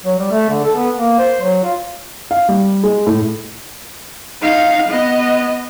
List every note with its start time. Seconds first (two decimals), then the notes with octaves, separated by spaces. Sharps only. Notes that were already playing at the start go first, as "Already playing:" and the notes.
0.04 F#3
0.19 G3
0.32 A3
0.49 D3
0.65 A4
0.76 B3
0.96 A#3
1.19 C5
1.42 F#3
1.64 F4
2.31 F5
2.49 G3
2.84 G#3
3.07 A2
4.41 D#4 F5
4.89 B3 D#5